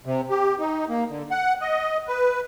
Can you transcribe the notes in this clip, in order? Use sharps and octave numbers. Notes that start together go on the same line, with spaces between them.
C3
G4
D#4
A#3
D3
F#5
D#5
B4